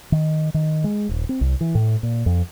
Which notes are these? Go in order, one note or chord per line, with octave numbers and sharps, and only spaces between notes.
D#3
D#3
G#3
D#1
C4
C2
E3
A2
A#2
F2